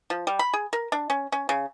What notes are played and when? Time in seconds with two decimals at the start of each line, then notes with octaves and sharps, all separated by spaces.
0.10 F3
0.27 G3
0.39 B5
0.53 G#4
0.73 A#4
0.92 D4
1.10 C#4
1.32 C#4
1.49 C#3